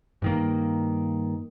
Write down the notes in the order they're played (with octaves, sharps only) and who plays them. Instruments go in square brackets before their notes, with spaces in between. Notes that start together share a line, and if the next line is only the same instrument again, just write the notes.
[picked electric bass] G2 D#3 A#3